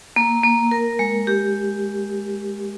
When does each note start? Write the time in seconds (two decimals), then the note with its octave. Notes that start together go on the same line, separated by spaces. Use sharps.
0.16 A#3
0.44 A#3
0.71 A#4
0.99 G#3
1.27 G4